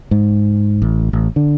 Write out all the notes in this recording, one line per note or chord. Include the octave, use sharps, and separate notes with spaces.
G#2
A1
A1
D3